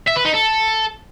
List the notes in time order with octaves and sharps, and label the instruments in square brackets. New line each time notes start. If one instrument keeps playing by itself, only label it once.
[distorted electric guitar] E5
B4
D#4
A4